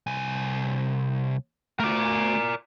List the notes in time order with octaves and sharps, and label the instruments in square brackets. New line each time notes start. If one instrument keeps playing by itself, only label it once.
[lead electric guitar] C2 G#5
[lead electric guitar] A3 F#4 [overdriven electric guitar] A#4 D5